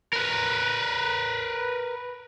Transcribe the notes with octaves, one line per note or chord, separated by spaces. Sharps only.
A#4 B4